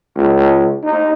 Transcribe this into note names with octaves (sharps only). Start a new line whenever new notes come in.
C#2
D#4